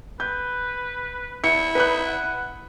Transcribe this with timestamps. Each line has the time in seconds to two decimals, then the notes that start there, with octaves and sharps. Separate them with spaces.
0.20 B4 G6
1.44 E4 C#7
1.75 D#4 B4 B5 F#6
2.06 F#5